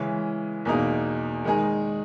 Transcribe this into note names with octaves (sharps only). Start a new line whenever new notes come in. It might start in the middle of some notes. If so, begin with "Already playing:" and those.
Already playing: C#3 E3 G#3 C#4
E2 B2 A#3 D#4 G#4
D#3 G#3 D#4 G#4